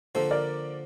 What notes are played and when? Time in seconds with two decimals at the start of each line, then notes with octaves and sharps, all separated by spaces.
0.15 D3 F3 A#3 A4 C5
0.31 A#4 D5